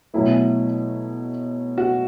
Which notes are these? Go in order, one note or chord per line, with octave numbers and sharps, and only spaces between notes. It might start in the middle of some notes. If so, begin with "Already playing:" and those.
B2 F#3 A3 E4
F#4